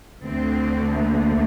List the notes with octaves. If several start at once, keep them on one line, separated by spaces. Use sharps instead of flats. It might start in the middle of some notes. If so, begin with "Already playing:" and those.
D2 D3 A3 C4
A#3